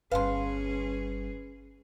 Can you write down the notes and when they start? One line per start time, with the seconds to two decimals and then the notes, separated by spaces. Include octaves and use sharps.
0.11 G1 G3 C#4 G#4 B4 F5 A5 C6